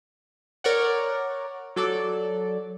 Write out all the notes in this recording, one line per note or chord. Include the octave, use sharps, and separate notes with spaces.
A#4 C#5 D5 F#5
F#3 A4 D5